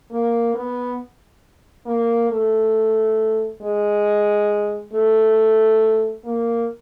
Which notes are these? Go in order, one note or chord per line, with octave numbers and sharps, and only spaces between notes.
A#3
B3
A#3
A3
G#3
A3
A#3